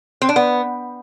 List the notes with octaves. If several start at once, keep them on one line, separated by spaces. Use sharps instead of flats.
C4
D4
B3